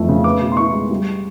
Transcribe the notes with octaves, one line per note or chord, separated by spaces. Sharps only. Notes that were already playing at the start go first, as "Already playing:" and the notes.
Already playing: F2 E3 F3 A3
C#3
B3 D6
B2
C6
E4 C#6
G#3
G3